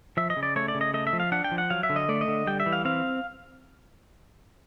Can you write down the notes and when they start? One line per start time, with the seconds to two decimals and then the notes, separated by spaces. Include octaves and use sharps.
0.17 F3 E5
0.30 D#5
0.37 C#3
0.43 D5
0.56 A3 C#5
0.68 D5
0.75 C#3
0.81 D#5
0.94 A3 D#5
1.07 E5
1.13 F3
1.20 F5
1.32 D4 F#5
1.44 G5
1.52 F3
1.58 F#5
1.70 F#3 F5
1.83 E5
1.90 D3
1.96 D#5
2.09 A3 D5
2.21 D#5
2.28 D3
2.47 G3 G5
2.60 E5
2.66 E3
2.73 F5
2.85 C4 F5